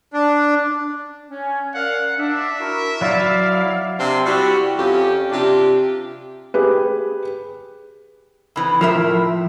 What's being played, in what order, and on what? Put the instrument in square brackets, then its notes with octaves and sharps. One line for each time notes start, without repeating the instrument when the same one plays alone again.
[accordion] D4
[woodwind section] C#4
[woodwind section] A#4 D5 F5 [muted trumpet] F#5
[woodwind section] D4 [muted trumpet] E5
[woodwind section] E4 F#4 A#4
[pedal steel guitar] F#3 E4 [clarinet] D5 [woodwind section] F5
[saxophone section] C3 D4 C5
G3 E4 F#4 G4
F2 C#4 G4
C3 D4 F4 G4
[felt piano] G4 G#4 B4
[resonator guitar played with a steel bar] F2 E3
[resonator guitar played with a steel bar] A2 A#4 E5 [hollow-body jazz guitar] F3